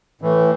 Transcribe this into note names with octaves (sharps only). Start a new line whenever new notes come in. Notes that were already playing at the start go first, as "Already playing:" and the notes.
A2 E3 A3